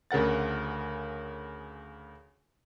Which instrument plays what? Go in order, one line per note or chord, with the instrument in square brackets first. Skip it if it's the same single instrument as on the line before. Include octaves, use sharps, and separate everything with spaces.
[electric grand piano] D2 C#3 A#4 F#5 A6